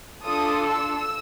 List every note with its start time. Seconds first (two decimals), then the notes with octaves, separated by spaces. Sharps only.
0.24 D4 F4 A4 D#6
0.66 E6